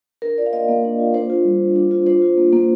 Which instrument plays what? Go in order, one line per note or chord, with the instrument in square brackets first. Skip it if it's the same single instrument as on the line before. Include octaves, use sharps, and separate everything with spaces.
[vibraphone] D4 A#4
F4 D5
F5
A#3 D#5
A#3
D4
F4
D4 C5
F4
G3
G3
D4
F4
D4 C5
F4
A#3
A#3